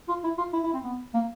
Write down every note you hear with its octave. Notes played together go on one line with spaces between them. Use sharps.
F4
E4
F4
E4
E4
C4
B3
A#3